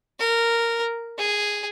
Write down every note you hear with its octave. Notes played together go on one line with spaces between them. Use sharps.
A#4
G#4